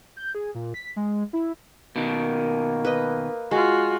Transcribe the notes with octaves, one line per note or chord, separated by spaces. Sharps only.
G6
G#4
A#2
B6
G#3
E4
B2 D#3 A#3
B4 D#5
G#3 F4 F#4